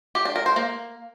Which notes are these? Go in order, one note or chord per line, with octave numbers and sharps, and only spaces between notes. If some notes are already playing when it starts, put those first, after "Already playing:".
G4
D4
A#4
C5
A#3